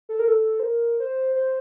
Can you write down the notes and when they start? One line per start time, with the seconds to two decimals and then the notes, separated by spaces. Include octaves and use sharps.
0.09 A4
0.19 A#4
0.28 A4
0.60 C5
0.63 A#4
1.00 C5
1.35 C5